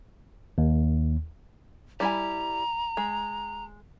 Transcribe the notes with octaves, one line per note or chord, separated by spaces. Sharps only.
D#2
G3 E4 G#5 A#5
G#3